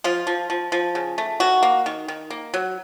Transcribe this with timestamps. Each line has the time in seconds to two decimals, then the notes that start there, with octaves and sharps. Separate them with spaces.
0.04 F3 F4
0.27 F3
0.50 F3
0.72 F3
0.95 C#3
1.18 A3
1.40 D#3 F#4
1.63 A#3
1.86 D#3
2.08 D#3
2.30 A#3
2.54 F#3